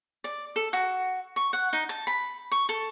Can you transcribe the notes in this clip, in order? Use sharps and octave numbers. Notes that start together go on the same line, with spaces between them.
D5
A4
F#4
C#6
F#5
D#4
A5
B5
C#6
A4